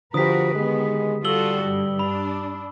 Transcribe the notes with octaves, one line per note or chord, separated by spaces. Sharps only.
D3 F3 F#4 G4 A#4 B4 D#6 B6
D#3 G#3 B3
G3 F4 F#4 A4 E6 F#7 G7
G2
D4 B5